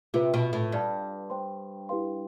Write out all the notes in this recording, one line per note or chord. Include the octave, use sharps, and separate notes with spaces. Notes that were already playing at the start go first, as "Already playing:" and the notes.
C3 F4 B4 E5
B2
A2
G2 B4 D5 F5 A5
C5 G5 C6
E4 G4 B4 F5 C6